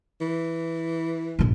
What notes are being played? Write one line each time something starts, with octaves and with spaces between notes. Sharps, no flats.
E3
A#1 G2